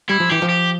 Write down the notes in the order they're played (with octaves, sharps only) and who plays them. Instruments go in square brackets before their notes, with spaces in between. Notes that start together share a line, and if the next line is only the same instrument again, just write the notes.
[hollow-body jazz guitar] G3 [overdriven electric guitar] E4
[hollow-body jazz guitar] F3
[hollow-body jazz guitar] E3 [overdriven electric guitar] G4
[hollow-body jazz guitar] F3
[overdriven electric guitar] G4